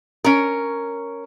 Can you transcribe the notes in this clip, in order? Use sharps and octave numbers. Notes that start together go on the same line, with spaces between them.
C#4 A#4